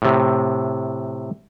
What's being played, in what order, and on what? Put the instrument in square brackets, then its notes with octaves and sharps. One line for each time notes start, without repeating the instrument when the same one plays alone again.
[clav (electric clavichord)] A2 C3